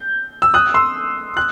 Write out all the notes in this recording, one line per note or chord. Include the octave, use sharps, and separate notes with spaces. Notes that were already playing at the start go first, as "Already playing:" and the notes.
Already playing: G6
E6
D#6 F#6
C6 E6
F#6